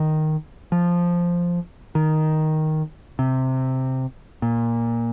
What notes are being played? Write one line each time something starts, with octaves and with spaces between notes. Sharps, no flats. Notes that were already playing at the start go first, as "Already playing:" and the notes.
Already playing: D#3
F3
D#3
C3
A#2